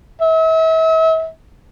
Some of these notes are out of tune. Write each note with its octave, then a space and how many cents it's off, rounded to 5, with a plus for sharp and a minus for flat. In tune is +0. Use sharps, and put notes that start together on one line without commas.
E5 -40